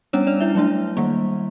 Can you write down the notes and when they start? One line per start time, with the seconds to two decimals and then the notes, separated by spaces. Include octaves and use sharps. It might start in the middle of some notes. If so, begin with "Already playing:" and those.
0.13 G3 B3 C#4 D4 C#5
0.27 D4 D5
0.41 E4 E5
0.55 F#3 A3 D4
0.97 D#3 G3 A#3